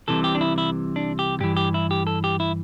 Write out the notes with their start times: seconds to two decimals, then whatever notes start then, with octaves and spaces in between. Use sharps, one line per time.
0.08 C2 C3 E3 A4
0.24 G4
0.35 D4
0.41 E4
0.58 E4
0.96 D4
1.19 G4
1.40 G2 E3 G4
1.57 G4
1.74 E4
1.91 G4
2.07 A4
2.24 G4
2.40 E4